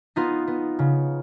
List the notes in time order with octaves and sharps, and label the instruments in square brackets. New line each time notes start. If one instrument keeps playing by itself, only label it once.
[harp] B3 D#4 F4
B3
C#3